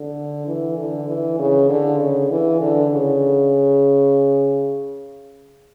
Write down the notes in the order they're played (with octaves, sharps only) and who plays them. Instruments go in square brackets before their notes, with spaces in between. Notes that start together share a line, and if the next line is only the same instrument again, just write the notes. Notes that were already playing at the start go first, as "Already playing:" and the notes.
Already playing: [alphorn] D3
E3
D3
E3
C#3
D3
C#3
E3
D3
C#3